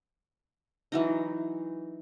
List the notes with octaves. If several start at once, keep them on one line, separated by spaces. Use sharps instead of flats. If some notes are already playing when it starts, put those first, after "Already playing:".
E3 F#3 D#4